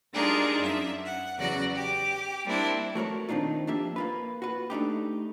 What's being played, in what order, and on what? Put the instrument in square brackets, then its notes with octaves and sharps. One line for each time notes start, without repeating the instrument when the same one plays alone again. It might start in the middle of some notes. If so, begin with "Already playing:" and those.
[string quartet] G3 D4 D#4 F4 G#4 A#4
F#2 E5
F#5
E2 C#3 F#3 F#4 D5 A#6
G4 D6
G3 A#3 C4 D4 E4
[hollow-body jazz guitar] A3 F#4 A#4 C#5
D#3 C4 D4 D#4 F4
F2 A#3 D4 G4 E5
A#3 F4 B4
F#4 B4
A3 D4 D#4 G4